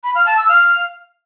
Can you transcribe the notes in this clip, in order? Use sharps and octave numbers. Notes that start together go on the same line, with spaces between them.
B5
F5
A5
E6
F5